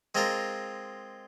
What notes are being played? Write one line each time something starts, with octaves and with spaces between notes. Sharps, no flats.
G#3 C4 F4 A#4